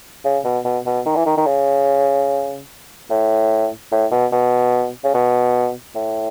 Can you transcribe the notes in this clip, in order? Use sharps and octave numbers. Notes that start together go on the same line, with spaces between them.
C#3
B2
B2
B2
D#3
E3
D#3
D#3
C#3
A2
A2
B2
B2
C#3
B2
A2